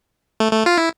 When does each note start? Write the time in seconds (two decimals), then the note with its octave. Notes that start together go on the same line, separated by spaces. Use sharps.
0.40 A3
0.53 A3
0.66 F4
0.78 E4